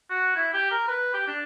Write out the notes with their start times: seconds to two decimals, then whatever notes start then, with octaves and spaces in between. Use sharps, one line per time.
0.10 F#4
0.36 E4
0.53 G4
0.71 A#4
0.88 B4
1.14 G4
1.27 D4